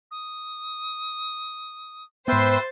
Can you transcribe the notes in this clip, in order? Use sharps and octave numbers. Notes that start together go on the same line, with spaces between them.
D#6
G#2 B3 B4 C5 E5 G5 A6